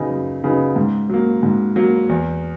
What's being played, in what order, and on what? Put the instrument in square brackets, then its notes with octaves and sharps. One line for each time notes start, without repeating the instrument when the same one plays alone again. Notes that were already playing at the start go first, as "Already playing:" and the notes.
Already playing: [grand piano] F#2 C#3 F#3 B3 D#4
F#2
C#3 F#3 B3 D#4
G#2
F#3 A#3
G#2
F#3 A#3
E2